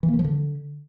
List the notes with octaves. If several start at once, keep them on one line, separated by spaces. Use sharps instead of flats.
E3
A#3
D#3
F3
D3